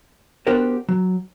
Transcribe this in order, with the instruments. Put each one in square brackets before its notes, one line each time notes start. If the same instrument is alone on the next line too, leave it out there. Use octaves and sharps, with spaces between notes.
[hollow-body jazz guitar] B3 D4 F#4 G4 A#4 C5
F#3